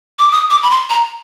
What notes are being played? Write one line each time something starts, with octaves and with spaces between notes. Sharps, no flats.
D6
D#6
D6
B5
C6
A#5